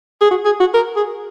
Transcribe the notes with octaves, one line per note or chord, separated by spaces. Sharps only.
G#4
F#4
G#4
F#4
A#4
G#4